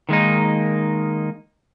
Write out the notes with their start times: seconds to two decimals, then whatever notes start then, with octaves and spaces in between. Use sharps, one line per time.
0.09 D#3 G#3 A#3 D#4